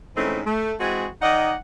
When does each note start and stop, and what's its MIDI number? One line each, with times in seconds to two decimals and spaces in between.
0.16 0.39 44
0.16 0.39 52
0.16 0.39 57
0.16 0.39 60
0.16 0.39 61
0.16 0.39 63
0.44 0.72 57
0.79 1.05 52
0.79 1.05 56
0.79 1.05 60
0.79 1.05 66
0.79 1.05 68
1.22 1.53 51
1.22 1.53 63
1.22 1.53 74
1.22 1.53 75
1.22 1.53 78